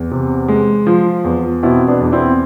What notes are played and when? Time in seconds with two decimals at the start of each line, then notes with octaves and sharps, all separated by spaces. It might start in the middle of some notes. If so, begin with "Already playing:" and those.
Already playing: E2
0.11 C3
0.48 G#3
0.87 F3
1.24 E2
1.63 B2 C4 E4
1.88 B3 D4
2.00 E2
2.12 C4 E4